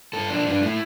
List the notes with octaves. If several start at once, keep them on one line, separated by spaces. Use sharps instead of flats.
G2 A4
F3 D4
G2 D4
A3 E4